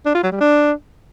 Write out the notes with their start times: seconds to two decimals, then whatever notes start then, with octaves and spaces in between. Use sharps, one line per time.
0.06 D4
0.15 F4
0.23 F#3
0.32 G3
0.41 D4